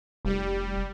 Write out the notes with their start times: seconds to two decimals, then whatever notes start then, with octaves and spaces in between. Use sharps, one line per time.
0.25 F1 G3